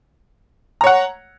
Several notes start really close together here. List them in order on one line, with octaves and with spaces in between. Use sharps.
A#5 C#5 F#5